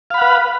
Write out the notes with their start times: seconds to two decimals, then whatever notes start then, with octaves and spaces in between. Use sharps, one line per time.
0.10 F5
0.14 B5
0.18 F#5
0.21 B4